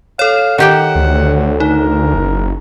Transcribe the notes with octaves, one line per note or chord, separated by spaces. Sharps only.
A4 C#5 F5
D#3 G4 F#5 G5
D2
D#4 A#4
F#1